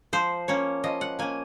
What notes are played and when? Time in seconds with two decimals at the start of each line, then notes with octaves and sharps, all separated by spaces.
0.13 F3 C5
0.48 A#3 C#4 C#5
0.84 F3 D#5
1.01 F#5
1.19 A#3 C#4 G#5